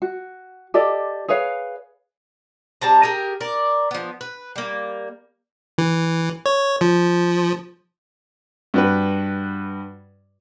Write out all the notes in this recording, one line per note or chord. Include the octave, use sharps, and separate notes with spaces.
F#4
G4 A4 D5 D#5
G#4 B4 C#5 F5
G3 C4 A5 A#5
G4 G#4 A#4
A#4 D5
F3 B3
B4
G3 A#3
E3
C#5
F3
G2 F#4 B4